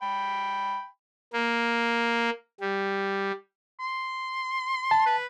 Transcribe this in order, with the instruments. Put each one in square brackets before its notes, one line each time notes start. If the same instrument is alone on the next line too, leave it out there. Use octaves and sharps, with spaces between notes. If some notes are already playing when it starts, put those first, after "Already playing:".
[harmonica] G5 B5
[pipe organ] A#3
G3
[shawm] C6
[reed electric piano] A5
[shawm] B4